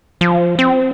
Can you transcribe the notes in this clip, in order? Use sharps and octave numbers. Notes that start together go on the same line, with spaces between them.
F3
C4